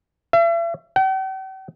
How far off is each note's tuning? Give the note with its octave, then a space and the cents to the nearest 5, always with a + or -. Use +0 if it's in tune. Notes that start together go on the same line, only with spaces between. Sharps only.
E5 +40
G5 -45